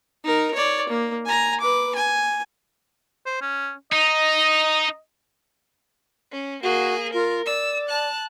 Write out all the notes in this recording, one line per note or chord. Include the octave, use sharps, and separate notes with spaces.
D#4 A#4
C#5 D5
A#3
G#5 A#5
B4 D6
G#5
C5
C#4
D#4 D#5
C#4
A#3 F#4 G#4
F4 A#4
D5 E6
A5 F#6